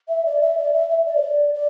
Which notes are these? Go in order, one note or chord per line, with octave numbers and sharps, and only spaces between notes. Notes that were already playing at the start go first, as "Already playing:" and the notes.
E5
D5
E5
D5
E5
E5
D5
C#5
D5
D5